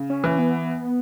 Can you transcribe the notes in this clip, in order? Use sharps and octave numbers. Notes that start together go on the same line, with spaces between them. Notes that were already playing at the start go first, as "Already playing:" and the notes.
Already playing: C#3
C#4
E3
B3